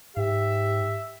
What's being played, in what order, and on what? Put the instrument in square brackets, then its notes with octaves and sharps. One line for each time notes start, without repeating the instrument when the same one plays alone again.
[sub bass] G#2 [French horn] G4 [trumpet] E5